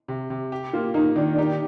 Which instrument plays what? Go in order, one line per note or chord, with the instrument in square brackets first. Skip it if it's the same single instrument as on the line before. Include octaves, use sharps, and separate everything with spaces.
[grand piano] C3
C3
G4
[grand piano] A#3 [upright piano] F4
[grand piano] A#3 [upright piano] D#4
[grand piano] D#3 [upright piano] D4
[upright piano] D4
[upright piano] D#4 [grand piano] G4